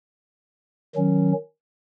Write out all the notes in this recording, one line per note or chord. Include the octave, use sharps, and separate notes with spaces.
D#3 F#3 C#4